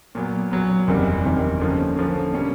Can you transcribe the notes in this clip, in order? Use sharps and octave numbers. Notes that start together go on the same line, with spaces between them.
A#2 F#3 B3
A#2 F#3 B3
F#1 E2 C3 D#3 G3
F#1 E2 C3 D#3 G3
D3 F3 A#3 C#4
D3 F3 A#3 C#4
B2 G3 A#3 C#4